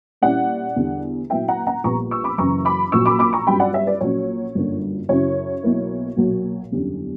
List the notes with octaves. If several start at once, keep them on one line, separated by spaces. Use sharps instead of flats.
A#2 G3 C#4 E4 D5 F#5
E2 D3 G3
A#2 F#3 B3 E4 E5 G5
F#5 A#5
F#5 A#5
A#1 A#2 G3 B3 A#5 C#6
C#6 E6
B5 D6
F#1 F#2 C#3 E3 A#5 C#6
B5 D6
A#1 A#2 F#3 C#6 E6
B5 D6
B5 D6
A#5 C#6
G1 G2 F#3 C#4 G5 B5
D5 F#5
C#5 E5
B4 D5
A#1 A#2 F#3 A#3 C#4 C#5
G1 F#2 D3 A#3
F#2 C#3 F#3 C#4 E4 C#5
B1 B2 A#3 E4
B1 A#2 F#3 A#3
F#1 E2 D3 G3 C#4